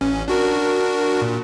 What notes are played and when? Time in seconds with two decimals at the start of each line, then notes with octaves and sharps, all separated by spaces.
0.01 A1 C#4
0.28 D4 F#4 A#4
1.22 A#2